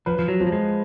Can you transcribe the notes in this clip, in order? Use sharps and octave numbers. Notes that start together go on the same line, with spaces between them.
F3 B4
F3
F#3
F3
F#3
G#3